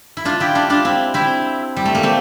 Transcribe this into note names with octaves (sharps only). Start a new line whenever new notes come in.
E4
D4 F4
E4 G4
D4 F4
D4 F4
C4 E4
C4 E4
G3
A3
A#3
A3 C4